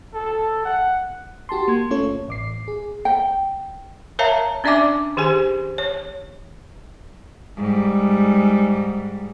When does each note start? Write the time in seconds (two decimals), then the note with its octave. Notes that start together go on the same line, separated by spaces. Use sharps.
0.14 A4
0.65 F#5
1.49 F#4 G4 A5 C6
1.68 A#3 C6 G#6
1.91 A3 C#4 F4 A4 C#5
2.03 G1
2.28 A1 D6 C7
2.68 G#4
3.05 G5
4.19 A#4 C#5 E5 F5 A5 A#5
4.64 C#4 D4 D5 E5 G#5 D6
5.17 D#3 G4 G#4 C5 G#5
5.78 C#5
7.57 G#2 G3